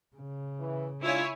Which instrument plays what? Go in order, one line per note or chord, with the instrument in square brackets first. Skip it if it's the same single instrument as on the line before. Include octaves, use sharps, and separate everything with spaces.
[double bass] C#3
[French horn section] E3
[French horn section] G#3 D4 F4 [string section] E4 C#5 G#5